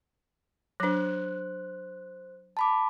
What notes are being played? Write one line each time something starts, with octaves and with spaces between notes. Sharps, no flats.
F#3 D4 C5 F#6
A5 B5 D6